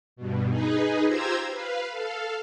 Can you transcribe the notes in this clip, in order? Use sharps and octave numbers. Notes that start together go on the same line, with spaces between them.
G2 B2
D#4 G#4 B4
F4 G4 C5 A#5 E6 G#6
B4 F5
A4 F5